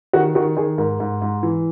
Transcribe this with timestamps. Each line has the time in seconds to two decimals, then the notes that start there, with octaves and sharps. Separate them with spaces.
0.13 D#3 F#4
0.35 D#3 F#4
0.57 D#3 G#4
0.78 G#2 A#4
1.00 G#2
1.22 G#2
1.43 E3